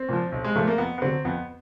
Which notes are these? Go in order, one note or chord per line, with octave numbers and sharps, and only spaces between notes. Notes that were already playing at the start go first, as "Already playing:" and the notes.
Already playing: C4
A#2 F3
B1
G#3
A#2 F3 A3
A#3
F2 B3
B3
D3 F#3 C4
F2 B3